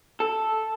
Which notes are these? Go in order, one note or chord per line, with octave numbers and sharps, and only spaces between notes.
A4